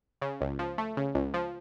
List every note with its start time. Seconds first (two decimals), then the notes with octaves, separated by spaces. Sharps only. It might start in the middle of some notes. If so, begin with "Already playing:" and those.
0.22 C#3
0.41 C#2
0.59 F3
0.78 A3
0.97 C#3
1.15 C#2
1.34 F3